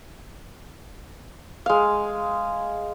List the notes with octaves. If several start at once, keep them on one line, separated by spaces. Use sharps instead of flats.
G#3 F5